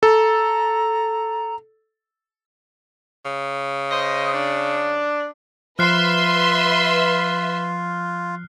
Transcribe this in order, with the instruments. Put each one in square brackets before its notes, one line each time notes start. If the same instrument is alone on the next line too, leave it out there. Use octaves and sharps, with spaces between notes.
[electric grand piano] A4 [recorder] A#5
[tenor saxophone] C#3
[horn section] C5 D#5
D4
[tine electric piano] F3 [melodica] F4 [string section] B4 E5 C6 [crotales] F6 F#6 C7